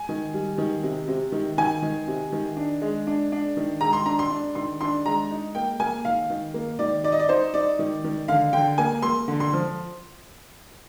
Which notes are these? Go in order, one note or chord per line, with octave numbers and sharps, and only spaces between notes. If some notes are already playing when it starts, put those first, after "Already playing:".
Already playing: G#5
D#3
G3
D#3
C3
C3
D#3
D#3 G#5
D#3
C3
D#3
D4
G#3
D4
D4
D#3
G#3 A#5
C6
D4 A#5
C6
D4
D#3 C6
D4 C6
G#3 A#5
D#4
A#3 G5
A#3 G#5
D#3 F5
D#3
A#3
D#3 D5
D#4 D5
D#5
D5
D#4 C5
D#4 D5
D#3
D#3
D3 F5
D3 G5
A#3 G#5
A#3 C6
D3
C6
F3